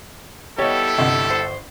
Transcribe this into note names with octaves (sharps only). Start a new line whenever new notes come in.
G3 B3 E4 G4 A4 C#5 D#5
G1 C3 D#5 F#5
C5